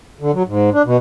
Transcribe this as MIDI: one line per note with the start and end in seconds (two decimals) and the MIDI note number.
0.21 0.31 50
0.34 0.43 54
0.47 0.70 44
0.73 0.82 62
0.85 0.97 47